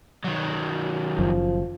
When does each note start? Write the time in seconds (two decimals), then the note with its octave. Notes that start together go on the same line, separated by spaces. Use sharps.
0.24 D#3 F#3
1.19 F#1 F#2 F3